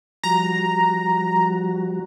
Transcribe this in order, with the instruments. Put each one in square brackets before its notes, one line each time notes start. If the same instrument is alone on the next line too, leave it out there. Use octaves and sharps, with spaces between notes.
[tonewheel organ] F3 G3 F#4 [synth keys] A#5